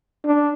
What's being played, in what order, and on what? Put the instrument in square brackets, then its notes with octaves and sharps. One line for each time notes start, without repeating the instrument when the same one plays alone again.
[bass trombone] D4